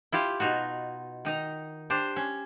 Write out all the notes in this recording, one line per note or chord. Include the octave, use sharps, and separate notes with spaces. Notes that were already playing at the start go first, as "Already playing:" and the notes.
E4 F4 G4
B2 D#4 F4 F#4
D#3 D#4 A#5
D4 G4 C5
C#4